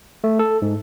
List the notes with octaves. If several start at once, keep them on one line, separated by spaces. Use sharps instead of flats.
A3
A4
G#2